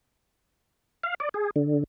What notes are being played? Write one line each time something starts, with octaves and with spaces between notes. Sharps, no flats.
F5
D5
G#4
D3